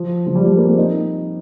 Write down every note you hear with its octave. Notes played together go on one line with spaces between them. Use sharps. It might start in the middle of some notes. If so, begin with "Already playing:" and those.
Already playing: F3
F3
G3
G3
A#3
C4
D#4